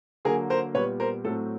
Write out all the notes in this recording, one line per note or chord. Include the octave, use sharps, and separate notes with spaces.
D3 F#3 A#3 G#4 A#4
A#4 C5
A#2 G3 B3 B4 C#5
A#4 C5
A2 F#3 A3 C4 A4